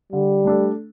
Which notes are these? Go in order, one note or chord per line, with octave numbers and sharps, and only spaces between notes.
D3 G3
A3 D4 A4